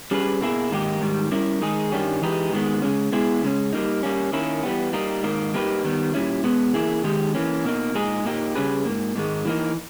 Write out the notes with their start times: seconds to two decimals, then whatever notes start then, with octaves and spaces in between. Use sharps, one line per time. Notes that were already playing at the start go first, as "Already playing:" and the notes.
0.11 G3 C#4 G#4 B4
0.41 B2 A#3 E4 G#4
0.72 G#2 D#3 A#3 D#4 G4
1.01 G#2 D#3 G3
1.31 G3 C#4 E4 A#4
1.62 D#3 G#3 D#4 G#4
1.92 G2 D#3 G3 C#4
2.22 E3 G#3 D#4 G4 B4
2.52 G#2 D#3 G#3 B3
2.82 C#3 G#3 C#4
3.12 B2 G#3 B3 E4 G#4
3.43 C#3 G#3 C#4
3.73 G3 A#3 D#4
4.03 G3 A#3 C#4
4.33 D#3 A#3 C#4 E4
4.63 E3 G3 B3
4.93 G3 A#3 D#4
5.23 G#2 D#3 A#3
5.54 G3 A#3 D#4 G4 B4
5.84 D#3 G3 B3
6.14 A#2 G3 C#4 E4
6.44 B2 G#3 B3
6.74 E3 A#3 E4 G#4
7.04 D#3 G#3 D#4 G4
7.34 E3 A#3 C#4
7.65 B2 A#3 D#4
7.94 A#2 G#3 D#4 G#4
8.24 A#2 A#3 D#4 G4
8.55 C#3 G3 C#4 G#4 B4
8.85 G#2 D#3 A#3
9.16 G#2 D#3 G#3
9.45 E3 A#3 D#4